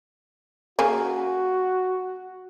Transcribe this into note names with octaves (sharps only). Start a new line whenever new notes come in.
C#3 A#3 F#4 G#5